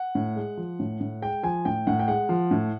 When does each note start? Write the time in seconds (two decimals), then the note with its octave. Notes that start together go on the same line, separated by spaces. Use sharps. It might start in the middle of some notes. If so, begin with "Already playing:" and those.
Already playing: F#5
0.15 A2
0.36 G#3
0.57 F3
0.79 A2
1.01 A2
1.22 G#3 G5
1.43 F3 G#5
1.65 A2 G5
1.87 A2 F#5
1.99 G5
2.08 G#3 F#5
2.29 F3
2.51 A2